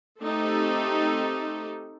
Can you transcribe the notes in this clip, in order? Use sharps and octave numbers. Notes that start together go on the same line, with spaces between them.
A3 C4 D#4 G4 A4